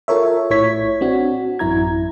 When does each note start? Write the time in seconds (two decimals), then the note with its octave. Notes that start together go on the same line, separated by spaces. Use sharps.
0.08 F4 A4 A#4 C#5 E5
0.50 A#1 A2 E4 C#5 G#6 B6
1.01 C4 D4 F#4
1.59 A1 F#2 E4 A#5 G#6